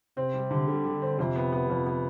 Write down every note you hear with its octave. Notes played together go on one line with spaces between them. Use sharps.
C3 C4
G3
D3
D3 G3
G3
C4
F2 C3
B3
B3
F2 C3
B3